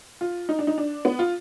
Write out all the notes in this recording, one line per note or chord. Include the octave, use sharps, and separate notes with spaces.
F4
D#4
D4
D#4
D4
B3
F4